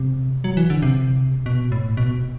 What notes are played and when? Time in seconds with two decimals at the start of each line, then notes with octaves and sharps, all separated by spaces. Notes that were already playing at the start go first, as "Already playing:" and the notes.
Already playing: C3
0.44 F#3
0.57 E3
0.70 D3
0.82 C3
1.46 B2
1.72 A2
1.97 B2